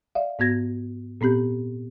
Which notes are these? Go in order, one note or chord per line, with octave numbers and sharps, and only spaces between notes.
D5 E5 F5
G#2 B3 F#4 G#6 A#6
A#2 B3 C4 G4 G6